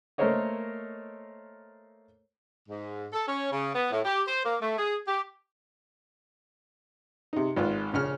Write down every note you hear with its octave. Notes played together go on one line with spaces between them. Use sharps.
A3 A#3 A#4 C5 C#5 D#5
G#2
A4
C#4
C#3
B3
A2
G4
C5
A#3
A3
G#4
G4
C3 D#4
G#1 F4 B4
A#1 C#3 C#4 F6